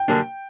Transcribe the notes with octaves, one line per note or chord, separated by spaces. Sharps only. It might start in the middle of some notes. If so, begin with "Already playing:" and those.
Already playing: G5
F#2 D3 G3 A#3 D4